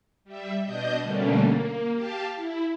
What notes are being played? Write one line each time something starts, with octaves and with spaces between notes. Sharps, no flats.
G3 E5
B2 D4 D#5 G6
B2 D3 G3 A3 A#3 C#4
A#3
G4 F5 A5
E4